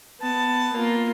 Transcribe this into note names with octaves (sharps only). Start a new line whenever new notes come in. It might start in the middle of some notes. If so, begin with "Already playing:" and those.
B3 A5
A#3 F4